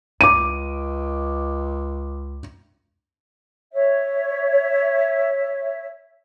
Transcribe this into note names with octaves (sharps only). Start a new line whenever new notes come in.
C#2 D6 D#7
C#5 E5